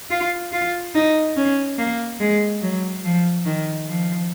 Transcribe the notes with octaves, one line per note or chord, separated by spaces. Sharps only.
F4
F4
D#4
C#4
A#3
G#3
F#3
F3
D#3
F3